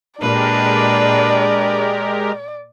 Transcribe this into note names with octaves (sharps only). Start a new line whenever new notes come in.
A#2 G#3 D4 G4 A#4 B4 D5